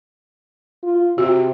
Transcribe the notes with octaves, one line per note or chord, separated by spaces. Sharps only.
F4
C3 F#4